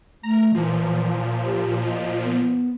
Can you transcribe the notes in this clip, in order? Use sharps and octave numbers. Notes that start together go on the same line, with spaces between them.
A3 A#5
A#2 E3 F3
G4
D#5
B3